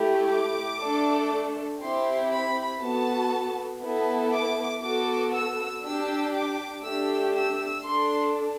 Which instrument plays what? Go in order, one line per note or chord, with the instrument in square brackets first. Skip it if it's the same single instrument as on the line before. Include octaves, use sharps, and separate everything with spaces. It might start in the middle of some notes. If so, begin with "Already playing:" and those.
Already playing: [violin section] A3 E4 G4
D6
A3 D4 A4
C4 E4 G4 C6
B5
B3 F#4 A4 A5
B3 E4 A4
D6
B3 F#4 A4 D6
E6
D4 G4 E6
D6
A3 D4 G4 E6
E6
D4 A4 C6